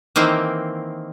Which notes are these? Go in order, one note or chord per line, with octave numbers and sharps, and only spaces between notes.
D#3 E3 A#3 C4